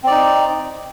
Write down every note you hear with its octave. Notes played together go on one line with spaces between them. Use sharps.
C4 D#4 D5